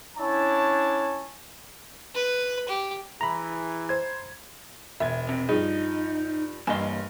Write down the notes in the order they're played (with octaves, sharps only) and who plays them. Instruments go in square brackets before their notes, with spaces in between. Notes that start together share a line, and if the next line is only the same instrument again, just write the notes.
[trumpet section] C#4 D4 E4 C#5 G#5 A5
[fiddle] B4
G4
[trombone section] E3 E4 G#4 [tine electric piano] A#5 B5
[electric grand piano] C5 G#6
[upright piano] E1 G#6 [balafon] E5
[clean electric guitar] C3
[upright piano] G2 F3 [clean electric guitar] D#4 [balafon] G#4
[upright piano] G2 [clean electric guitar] E3 A#3 C6 [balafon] D#5 G#5